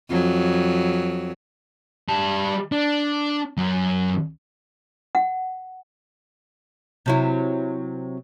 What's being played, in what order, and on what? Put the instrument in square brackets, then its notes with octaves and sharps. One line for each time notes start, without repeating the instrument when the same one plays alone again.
[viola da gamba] F2 F#3
[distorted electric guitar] G3 A5
D4
F#2 F#3
[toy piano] F#5
[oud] C3 F#3 E4